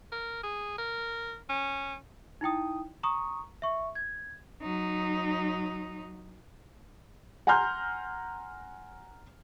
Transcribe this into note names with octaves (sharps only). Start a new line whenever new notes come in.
A#4
G#4
A#4
C#4
D#4 E4 G5 D#6
A#5 C#6 D#6
E5 C#6
G#6
F#3 D#4
F#5 G#5 A#5 C6 F6 G6